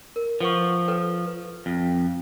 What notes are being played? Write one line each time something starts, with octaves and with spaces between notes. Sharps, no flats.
A#4
F3 B4 F#5 C#6
A4 B4 G5
B4
F2